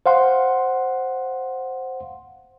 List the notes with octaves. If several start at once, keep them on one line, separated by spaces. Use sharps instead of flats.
C5 F5 F#5 C6